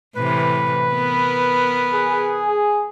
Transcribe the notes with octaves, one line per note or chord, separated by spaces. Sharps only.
A2 C3 E3 B4
B3 A#4
G#4